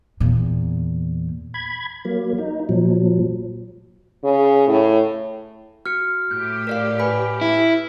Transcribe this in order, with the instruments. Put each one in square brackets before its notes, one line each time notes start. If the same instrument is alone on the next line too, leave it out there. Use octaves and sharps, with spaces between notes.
[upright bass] E2 A#2
[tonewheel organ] B5 G#6
F#3 A#3
D#4
A#2 F3 F#3
[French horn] C#3
A2
[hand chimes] F#4 [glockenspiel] F6 C#7
[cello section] A2 G4 [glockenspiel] G6
[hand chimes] A#4 D5 F5
B4 G#5 B5
[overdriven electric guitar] E4